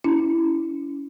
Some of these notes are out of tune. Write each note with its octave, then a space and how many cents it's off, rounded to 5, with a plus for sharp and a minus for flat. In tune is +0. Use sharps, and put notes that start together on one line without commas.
C#4 +30 E4 +0